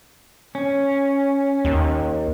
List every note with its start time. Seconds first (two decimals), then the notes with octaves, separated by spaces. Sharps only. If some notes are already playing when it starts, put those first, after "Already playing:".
0.55 C#4
1.65 D#2